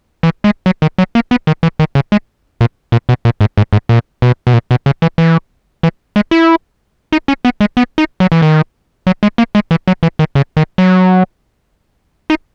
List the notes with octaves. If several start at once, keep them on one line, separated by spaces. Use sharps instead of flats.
E3
G#3
F#3
D#3
F#3
A#3
B3
D#3
E3
D#3
C#3
G#3
A#2
A#2
B2
A#2
G#2
G#2
G#2
A#2
B2
B2
A#2
B2
C#3
E3
E3
E3
G#3
E4
D#4
C#4
B3
G#3
B3
D#4
F#3
E3
D#3
F#3
G#3
A#3
G#3
E3
F#3
E3
D#3
C#3
D#3
F#3
D#4